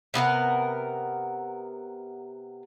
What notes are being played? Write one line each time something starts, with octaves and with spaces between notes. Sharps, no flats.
C3 B3 A#4 F#5